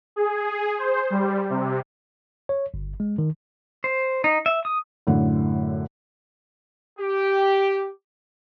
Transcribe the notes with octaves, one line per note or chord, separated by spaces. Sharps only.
G#4
C5
G3
C3
C#5
G1
G#3
D#3
C5
D#4
E5
D#6
F#2 A2 D3
G4